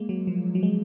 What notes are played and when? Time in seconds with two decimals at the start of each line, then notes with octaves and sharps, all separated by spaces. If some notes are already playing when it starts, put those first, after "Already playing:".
Already playing: G#3 A#3
0.09 F#3
0.27 F3
0.55 F#3
0.63 G#3